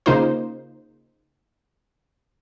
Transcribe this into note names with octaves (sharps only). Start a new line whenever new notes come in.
C#3 A#3 D#4 F4 C5